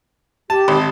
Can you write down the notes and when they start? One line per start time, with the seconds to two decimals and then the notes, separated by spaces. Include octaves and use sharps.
0.50 G4 A5
0.68 G#1